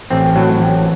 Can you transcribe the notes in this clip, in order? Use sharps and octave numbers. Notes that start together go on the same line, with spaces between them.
A1 C4
A2 F#3
A1